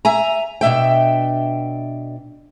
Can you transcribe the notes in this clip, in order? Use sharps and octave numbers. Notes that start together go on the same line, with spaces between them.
E5 G#5 A#5
B2 D4 E5 G5